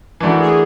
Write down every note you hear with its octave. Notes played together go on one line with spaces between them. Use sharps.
E3 A3 D4 F#4 A#4
G#4